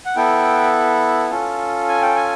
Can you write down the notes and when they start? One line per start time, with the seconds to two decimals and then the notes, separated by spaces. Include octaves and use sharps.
0.06 F#5
0.16 B3 E4 A4 G5
1.30 C#4 F4 A4
1.88 G#5
2.02 G5
2.16 G#5